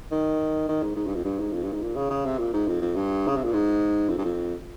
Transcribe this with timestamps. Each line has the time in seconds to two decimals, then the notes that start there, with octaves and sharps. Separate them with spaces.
0.11 D#3
0.69 D#3
0.83 G#2
0.96 G#2
1.06 G2
1.15 F2
1.25 G2
1.39 G#2
1.53 F2
1.64 G2
1.73 G#2
1.82 A#2
1.96 C#3
2.10 C#3
2.25 C3
2.38 A#2
2.53 G#2
2.67 F2
2.82 F2
2.96 G2
3.28 C#3
3.36 C3
3.44 A#2
3.53 G#2
4.09 F2
4.18 G2
4.24 F2